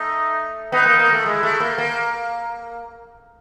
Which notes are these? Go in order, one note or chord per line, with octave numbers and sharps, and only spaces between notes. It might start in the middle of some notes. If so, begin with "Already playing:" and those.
Already playing: A3 D#4
B3 D#4
A#3
A#3
A3
G#3 E4
A3
A#3
A#3